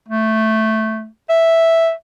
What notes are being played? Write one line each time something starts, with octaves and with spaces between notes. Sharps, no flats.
A3
E5